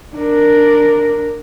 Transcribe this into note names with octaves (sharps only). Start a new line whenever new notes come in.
D4 A#4